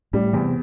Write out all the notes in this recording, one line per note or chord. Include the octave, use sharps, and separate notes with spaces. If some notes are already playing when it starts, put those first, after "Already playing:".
A2 G3
E2 C3